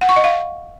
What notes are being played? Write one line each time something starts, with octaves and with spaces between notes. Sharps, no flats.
F#5
C#6
D#5
F5